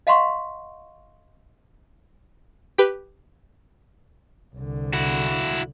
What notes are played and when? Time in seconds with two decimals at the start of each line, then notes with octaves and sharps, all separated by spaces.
0.07 D#5 F5 F#5 A#5 C6 C#6
2.78 G4 B4
4.55 C2 D3
4.93 E4 F#4